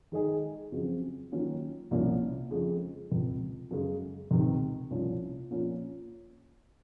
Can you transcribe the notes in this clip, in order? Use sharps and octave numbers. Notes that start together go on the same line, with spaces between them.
D#3 G#3 D#4 G#4
F2 C#3 F#3 C4
D#3 F#3 A#3 C#4 F4
C2 A#2 F3 A#3 C#4
F2 C#3 G#3
C#2 C3 F3
F#2 C#3 G#3
C#2 C3 D#3
C2 A#2 F3 A#3 C#4
A#2 F3 A#3 C#4 F4